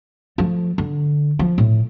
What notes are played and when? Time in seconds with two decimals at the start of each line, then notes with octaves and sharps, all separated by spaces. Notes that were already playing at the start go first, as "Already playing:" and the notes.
0.38 F3 A3
0.78 D3
1.39 F3
1.58 A2